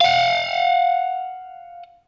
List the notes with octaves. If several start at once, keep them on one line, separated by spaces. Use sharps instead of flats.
F5 F#5